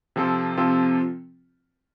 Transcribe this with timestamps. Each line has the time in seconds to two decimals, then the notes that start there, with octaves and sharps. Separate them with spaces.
0.16 C3 F3 C4 F4 A4
0.57 C3 F3 C4 F4 A4